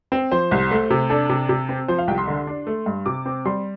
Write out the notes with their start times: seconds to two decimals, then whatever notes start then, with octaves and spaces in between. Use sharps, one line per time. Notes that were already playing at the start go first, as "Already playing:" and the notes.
0.12 C4
0.32 F3 C5
0.51 C2
0.71 A3
0.90 C3
1.10 D4 A4
1.29 C3
1.49 C3
1.69 C4
1.88 F3 C5
1.98 F5
2.07 C2 G5
2.18 C6
2.27 D3
2.47 D4
2.67 A3
2.86 G2
3.06 C3 D6
3.26 C4
3.45 G3 C6